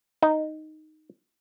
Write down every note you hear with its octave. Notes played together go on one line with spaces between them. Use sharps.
D#4